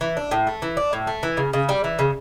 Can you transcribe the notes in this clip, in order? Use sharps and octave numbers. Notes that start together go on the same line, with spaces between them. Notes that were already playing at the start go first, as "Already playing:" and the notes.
E3
D4
A2
A3
E3
D4
A2
A3
E3
C#3
C#3
G3
E3
C#3